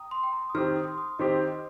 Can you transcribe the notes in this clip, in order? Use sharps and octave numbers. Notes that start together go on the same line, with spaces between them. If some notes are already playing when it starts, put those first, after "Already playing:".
Already playing: G5 A#5 D#6
C6
G5
A#5
D#6
D#3 C4 G4 F6
D#6
C6
D#6
D#3 C4 G4 D#5
D#5
C5